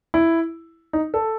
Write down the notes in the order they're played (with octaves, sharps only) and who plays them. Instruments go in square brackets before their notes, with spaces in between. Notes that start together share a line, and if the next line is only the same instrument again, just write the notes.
[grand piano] E4
D#4
A4